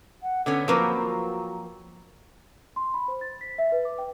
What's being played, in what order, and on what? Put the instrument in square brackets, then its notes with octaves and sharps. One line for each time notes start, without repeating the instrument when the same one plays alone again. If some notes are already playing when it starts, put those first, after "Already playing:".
[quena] F#5
[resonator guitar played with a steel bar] D3 B3 C#4 [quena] A4
[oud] F3 A#4 B4 [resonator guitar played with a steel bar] F#3 A#3 C4 [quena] F#4
[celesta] C6
B5
C5
A6
B6
E5
B4
D6
G5